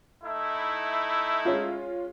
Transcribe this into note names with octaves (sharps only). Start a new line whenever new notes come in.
A3 D#4 E4
G#3 C#4 F4